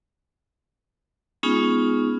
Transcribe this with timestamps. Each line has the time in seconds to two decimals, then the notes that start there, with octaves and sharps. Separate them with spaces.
1.43 G#3 B3 C#4 D#4 F4 G#4